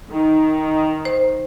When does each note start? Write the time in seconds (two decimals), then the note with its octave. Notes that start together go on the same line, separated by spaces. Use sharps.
0.11 D#3
1.05 C5